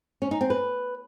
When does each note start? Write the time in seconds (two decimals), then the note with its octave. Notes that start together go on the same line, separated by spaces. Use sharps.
0.22 C#4
0.31 D#4
0.41 C4
0.50 B4